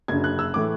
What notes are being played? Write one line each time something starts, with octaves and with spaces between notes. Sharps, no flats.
F#1 F#2 D3 G#6
F#6
E6
A2 E3 A3 D6